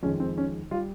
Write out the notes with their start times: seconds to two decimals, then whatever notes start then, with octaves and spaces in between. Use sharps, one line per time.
0.03 F2 D#3 G#3 C#4
0.20 C4
0.38 C#4
0.71 G3 F4